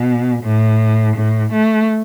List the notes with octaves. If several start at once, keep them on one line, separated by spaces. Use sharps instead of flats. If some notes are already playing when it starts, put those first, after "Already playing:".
Already playing: B2
A2
A2
A3